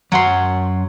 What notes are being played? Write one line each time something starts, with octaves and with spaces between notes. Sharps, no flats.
F#2 F#3 F#5 C6